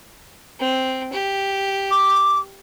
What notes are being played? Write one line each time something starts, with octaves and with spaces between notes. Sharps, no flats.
C4
G4
D6